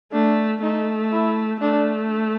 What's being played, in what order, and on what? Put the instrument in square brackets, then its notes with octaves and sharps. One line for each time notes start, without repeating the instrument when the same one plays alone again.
[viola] A3 [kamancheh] D4
[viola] A3 [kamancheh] D#4
[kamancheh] E4
[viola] A3 [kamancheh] D4